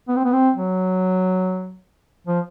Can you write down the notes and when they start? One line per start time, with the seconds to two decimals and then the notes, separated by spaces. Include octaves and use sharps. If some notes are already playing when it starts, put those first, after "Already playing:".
0.08 B3
0.16 C4
0.24 B3
0.33 C4
0.56 F#3
2.27 F3